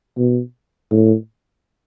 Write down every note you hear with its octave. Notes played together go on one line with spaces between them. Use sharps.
B2
A2